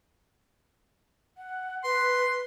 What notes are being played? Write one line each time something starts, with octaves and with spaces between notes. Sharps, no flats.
F#5
B4 C6